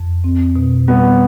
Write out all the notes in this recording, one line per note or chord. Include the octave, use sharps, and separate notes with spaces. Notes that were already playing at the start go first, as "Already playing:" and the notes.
Already playing: F2
C4
B2
G3 B3